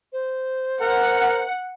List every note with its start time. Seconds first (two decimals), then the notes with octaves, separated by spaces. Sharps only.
0.13 C5
0.81 A#4 F#5